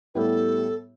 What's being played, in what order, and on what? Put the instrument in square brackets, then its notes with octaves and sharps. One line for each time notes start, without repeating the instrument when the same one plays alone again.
[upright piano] A2 G3 B3 E4 G4 [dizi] A4 B4